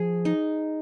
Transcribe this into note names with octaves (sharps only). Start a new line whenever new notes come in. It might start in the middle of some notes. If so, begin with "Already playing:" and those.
Already playing: F3 G#4
D#4